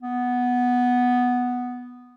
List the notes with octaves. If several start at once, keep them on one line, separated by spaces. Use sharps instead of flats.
B3